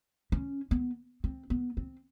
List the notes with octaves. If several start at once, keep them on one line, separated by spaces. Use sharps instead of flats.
C#4
B3
C4
B3
C4